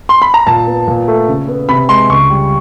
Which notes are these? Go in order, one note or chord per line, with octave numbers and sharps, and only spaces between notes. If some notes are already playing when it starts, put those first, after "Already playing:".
C6
B5
A#5
A#2 A5
B3
A#2
A3
C#3
B3
C3 B5
G#3 C6
C#2 C#6
G3